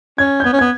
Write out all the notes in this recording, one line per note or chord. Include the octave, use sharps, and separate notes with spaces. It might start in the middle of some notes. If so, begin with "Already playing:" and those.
C#4 G#6
G6
B3 G#6
C#4
B3 G#6